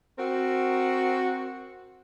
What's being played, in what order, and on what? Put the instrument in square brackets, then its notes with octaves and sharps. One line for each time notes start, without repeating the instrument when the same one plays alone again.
[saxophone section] C4 F#4 A#4